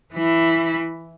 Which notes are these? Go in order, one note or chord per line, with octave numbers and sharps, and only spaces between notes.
E3 E4